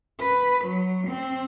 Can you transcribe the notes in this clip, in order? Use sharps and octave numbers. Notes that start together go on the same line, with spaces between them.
B4
F#3
C4